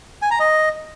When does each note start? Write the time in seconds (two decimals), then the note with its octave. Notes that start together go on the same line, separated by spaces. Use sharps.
0.22 G#5
0.31 A#5
0.40 D#5